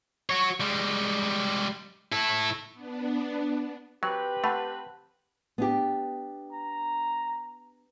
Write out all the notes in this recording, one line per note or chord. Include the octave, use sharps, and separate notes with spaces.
F#4 C#5
G3 G#3
E4 A4
B3 D4
F#3 C4 G4 B4 G5
A3 F#5 A5 B5
B3 D4 G4
A#5